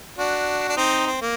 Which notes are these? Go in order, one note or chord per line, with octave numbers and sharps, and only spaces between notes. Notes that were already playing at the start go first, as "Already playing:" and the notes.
D4 F#4
D4
C4 D#4
C4
A#3